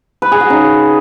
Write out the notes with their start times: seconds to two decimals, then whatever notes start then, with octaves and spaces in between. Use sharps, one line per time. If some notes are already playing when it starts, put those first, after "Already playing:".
0.22 B4
0.32 G#4
0.41 F#4
0.50 C#3 D#4